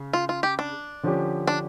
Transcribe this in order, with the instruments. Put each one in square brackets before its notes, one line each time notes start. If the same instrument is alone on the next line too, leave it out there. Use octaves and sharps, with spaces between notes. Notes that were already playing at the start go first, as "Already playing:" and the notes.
Already playing: [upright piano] C#3
[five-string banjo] F4
F4
G4
D4
[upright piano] D3 F3 C#4 G4
[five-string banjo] D4